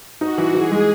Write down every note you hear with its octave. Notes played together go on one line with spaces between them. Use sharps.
D#4 F#4
E3
E3 G#4
G#3